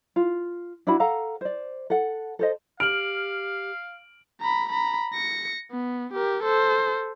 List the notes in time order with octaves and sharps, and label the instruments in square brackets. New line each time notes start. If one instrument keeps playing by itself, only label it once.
[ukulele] F4
D4 E4 F#4 B5
A4 F5 F#5 A#5
C5 D5
A4 F#5
A4 C5 D#5
[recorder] G4 [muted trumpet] F5 [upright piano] F6 [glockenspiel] D7 F#7
[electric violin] A#5 B5
A#5 B5
A#6 C#7
B3
G4 A#4
A4 C5